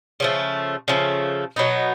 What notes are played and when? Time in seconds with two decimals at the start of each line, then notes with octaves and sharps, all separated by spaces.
0.20 C#3 F3 A3
0.88 C#3 F3 A3
1.56 B2 F#3 B3 D#4